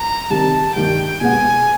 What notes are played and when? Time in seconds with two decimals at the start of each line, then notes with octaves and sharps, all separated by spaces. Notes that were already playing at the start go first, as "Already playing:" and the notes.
Already playing: A#5
0.30 C3 D#3 G3 A5
0.75 G2 D#3 G3 G5
1.20 B2 G#3 B3 G#5